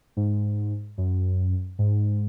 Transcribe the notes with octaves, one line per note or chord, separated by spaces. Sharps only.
G#2
F#2
G#2